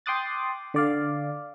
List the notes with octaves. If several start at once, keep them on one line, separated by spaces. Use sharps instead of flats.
G5 C6 D6 D#6 F#6 A6
D3 D5 F5